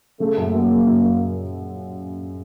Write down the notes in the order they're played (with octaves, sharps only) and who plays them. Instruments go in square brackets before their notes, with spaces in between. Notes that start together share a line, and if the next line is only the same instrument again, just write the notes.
[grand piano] C#3 [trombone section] A3
[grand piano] F#2
[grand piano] F#3 [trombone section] A#3
[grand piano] C#3
F#2
F#2